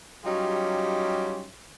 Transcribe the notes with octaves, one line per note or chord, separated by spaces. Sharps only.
F#3 G3 C#4 D#4 F4 G4